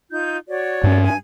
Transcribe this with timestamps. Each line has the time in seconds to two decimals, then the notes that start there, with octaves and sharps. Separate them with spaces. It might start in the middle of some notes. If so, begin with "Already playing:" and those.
0.11 D#4 F4 G6
0.48 F#4 C#5 D5
0.84 G2 C#4
1.04 G#5